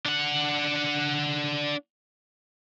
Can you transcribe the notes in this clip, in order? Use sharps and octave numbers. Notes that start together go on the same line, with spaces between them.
D4 F#5